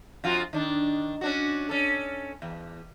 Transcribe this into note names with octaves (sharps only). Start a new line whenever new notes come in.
F2 F4 F#4
D#3 D4
C#4 D4 F#4
C#4 A4
E2